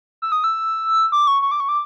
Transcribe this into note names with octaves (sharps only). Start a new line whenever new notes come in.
E6
D#6
E6
D6
C#6
C#6
D6
C#6
D6